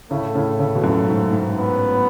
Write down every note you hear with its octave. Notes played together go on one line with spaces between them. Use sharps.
A2 C#3 A3
A2 C#3
A2 C#3
B2
F#2 A2
G#2
G#2
B3